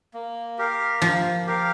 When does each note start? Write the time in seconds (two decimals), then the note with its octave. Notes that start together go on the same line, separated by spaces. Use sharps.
0.14 A#3
0.59 G4 A#4 F5
1.02 F3 A#3
1.47 G4 A#4 F5